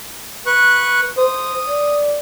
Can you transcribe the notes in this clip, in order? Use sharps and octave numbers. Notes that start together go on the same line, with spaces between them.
B4 C#6 F#6
C5 D#6
D5